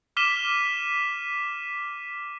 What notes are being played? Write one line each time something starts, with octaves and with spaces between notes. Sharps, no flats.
D6 F6 B6 D#7 E7 G7